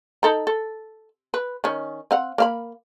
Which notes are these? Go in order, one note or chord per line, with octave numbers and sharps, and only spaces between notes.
D#4 A4 A#5
A4
B4
D#3 C#4
C4 F5 F#5
A#3 F5 B5